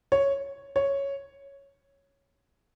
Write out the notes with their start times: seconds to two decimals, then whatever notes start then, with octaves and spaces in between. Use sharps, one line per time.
0.12 C#5
0.76 C#5